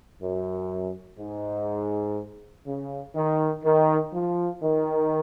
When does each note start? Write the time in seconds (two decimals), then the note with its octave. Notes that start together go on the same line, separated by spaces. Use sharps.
0.21 F#2
1.19 G#2
2.66 C#3
3.15 D#3
3.64 D#3
4.13 F3
4.63 D#3